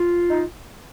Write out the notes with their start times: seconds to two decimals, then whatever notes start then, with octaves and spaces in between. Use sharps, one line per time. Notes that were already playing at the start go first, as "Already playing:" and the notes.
Already playing: F4
0.29 D#4